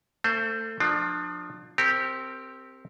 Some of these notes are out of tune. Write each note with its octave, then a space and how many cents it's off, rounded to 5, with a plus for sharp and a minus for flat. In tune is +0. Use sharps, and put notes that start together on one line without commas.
A3 +30 C5 +0
F3 +25 A#3 +0 D4 +35
C4 +0 G4 +0 A#4 -30